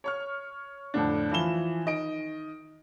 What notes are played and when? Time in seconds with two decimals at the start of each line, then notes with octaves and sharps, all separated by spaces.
0.04 C#5 C#6 F6
0.94 F2 A2 D3 D4
1.32 E3 F3 E4 F4 E7 G7
1.86 D#3 D#5 D7